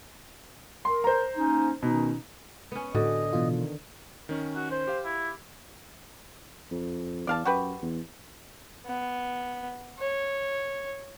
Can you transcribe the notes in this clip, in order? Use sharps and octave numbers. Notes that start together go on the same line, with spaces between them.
A#4 C6
C5 A#5
A#3 C#4 D#4
B2 D#3 C#4 D#4
B3 C#4
A2 D3 F#4 D#5
B2 E3 F4
D#3
D#3 C#4
F#4
C5
G4 F5
E4
F2
E2 D5 F5 A5
F#2 F#4 G4 B4
E2
B3
C#5